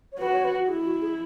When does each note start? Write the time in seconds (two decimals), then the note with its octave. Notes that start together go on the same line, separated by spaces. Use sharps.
0.12 C#5
0.19 F#4 B4
0.33 C#5
0.45 B4
0.59 F#4
0.69 E4 G#4
0.85 F#4
1.02 G#4